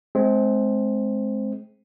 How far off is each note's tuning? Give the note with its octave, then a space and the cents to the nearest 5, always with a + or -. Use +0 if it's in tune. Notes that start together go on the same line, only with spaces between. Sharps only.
G#3 +35 C4 +0